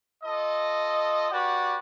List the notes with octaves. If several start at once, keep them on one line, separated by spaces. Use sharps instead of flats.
F4 A4 D#5
F#4 G4 B4 D5 F#5